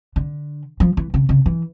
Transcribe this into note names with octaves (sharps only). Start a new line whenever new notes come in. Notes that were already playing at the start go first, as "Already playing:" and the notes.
D3
F3
E3
C#3
C#3
E3